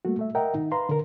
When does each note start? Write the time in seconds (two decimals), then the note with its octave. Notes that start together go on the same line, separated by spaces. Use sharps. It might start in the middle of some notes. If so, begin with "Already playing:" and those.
0.05 G3 A3 A#3 F#4
0.19 A3 E5
0.35 A#4 D#5 E5 F#5 G5 A#5
0.54 D#3 D#4
0.72 B4 F5 A#5 C6
0.89 D3 A#4